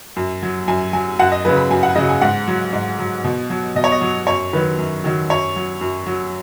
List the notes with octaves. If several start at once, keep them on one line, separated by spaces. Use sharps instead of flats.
F#2
F#3
F#2 G#5
F#3 G#5
F#2 F#5
D#5
C#3 F#3 B4
B5
F#2 G#5
F#5
C#3 F#3 D#5
G#5
G#2 F#5
F#3
G#2
F#3
B2
F#3
B2 D#5
C#5
D#5
F#3
F#2 C#5
D#3 F#3 B4
F#2
D#3 F#3
F#2 C#5
F#3
F#2
F#3